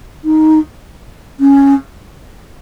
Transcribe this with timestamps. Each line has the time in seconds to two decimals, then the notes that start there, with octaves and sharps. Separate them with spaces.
0.24 D#4
1.40 C#4